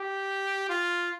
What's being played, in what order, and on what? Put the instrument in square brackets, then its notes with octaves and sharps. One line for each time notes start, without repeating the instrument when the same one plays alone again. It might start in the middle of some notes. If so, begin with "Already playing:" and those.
Already playing: [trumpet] G4
F4